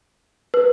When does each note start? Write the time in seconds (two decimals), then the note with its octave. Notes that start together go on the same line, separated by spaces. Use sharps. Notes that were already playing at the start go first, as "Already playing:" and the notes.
0.54 B4